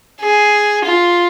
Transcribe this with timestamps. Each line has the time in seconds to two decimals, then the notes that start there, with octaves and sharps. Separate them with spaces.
0.20 G#4
0.85 F4